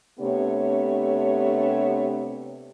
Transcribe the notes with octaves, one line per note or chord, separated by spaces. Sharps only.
C3 A3 B3 D4 G4 C#5